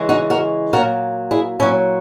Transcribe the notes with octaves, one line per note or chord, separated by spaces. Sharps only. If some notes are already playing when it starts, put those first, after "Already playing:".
Already playing: C#3 E3 G#3
D#4 F#4
F#4 A#4
A#2 F#3 F#4 A#4
E4 G#4
A#2 F#3 C#4 E4